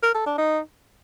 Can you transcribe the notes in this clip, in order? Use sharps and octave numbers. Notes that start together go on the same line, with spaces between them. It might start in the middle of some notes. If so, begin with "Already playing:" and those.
A#4
A4
D4
D#4